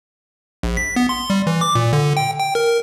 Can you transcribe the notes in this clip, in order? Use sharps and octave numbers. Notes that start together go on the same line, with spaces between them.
A#1
B6
B3
C6
G3
E3
D6
A#2
D3
G5
G5
A#4